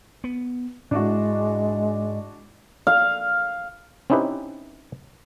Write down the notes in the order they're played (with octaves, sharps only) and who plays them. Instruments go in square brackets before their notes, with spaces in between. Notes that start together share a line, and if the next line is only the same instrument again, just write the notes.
[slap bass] B3
[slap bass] G#2 [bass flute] G#3 [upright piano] D4 E4 F#4
[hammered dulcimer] F5
[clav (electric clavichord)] C4 C#4 D#4 E4 G4 B4